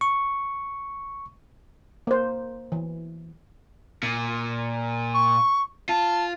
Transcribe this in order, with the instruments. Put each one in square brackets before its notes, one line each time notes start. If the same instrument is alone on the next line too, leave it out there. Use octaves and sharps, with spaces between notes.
[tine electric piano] C#6
[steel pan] A#3 C5
E3
[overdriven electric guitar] A#2
[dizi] C#6
[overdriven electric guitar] F4 [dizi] A5